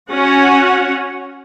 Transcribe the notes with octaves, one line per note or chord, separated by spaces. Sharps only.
C#4 F#4 F#5